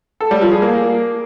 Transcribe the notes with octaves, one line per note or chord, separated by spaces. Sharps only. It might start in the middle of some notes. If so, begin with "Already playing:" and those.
A4
G3
F3
G#4
A#3